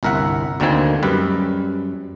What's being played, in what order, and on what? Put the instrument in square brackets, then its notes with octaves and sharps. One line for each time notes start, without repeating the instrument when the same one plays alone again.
[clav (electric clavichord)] G1 C2 A#4 E5 F#5
D2 D3 D#3 A#3 C4 G#5
F#2 G3 B4